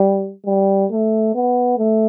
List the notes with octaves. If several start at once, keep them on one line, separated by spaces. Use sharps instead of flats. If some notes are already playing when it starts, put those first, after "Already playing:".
Already playing: G3
G3
A3
B3
A3